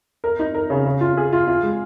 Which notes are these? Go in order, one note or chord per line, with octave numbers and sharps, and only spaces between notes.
A#4
D#4
A#4
C#3
C#3
F4
G#4
F4
F4
G#3